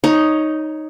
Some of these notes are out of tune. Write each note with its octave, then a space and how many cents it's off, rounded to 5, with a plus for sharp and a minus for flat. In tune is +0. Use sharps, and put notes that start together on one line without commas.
D#4 +0 C#5 +0 A#5 +40